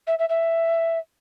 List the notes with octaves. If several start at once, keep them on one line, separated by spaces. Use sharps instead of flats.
E5
E5
E5